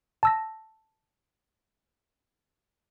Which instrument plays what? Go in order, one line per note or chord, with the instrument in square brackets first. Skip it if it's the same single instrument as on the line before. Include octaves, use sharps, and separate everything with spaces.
[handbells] A5 E6 A#6